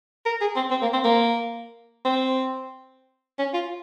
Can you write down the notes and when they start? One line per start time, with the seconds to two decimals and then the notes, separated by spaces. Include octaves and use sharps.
0.26 A#4
0.41 G#4
0.56 C4
0.71 C4
0.82 A#3
0.93 C4
1.04 A#3
2.05 C4
3.39 C#4
3.54 F4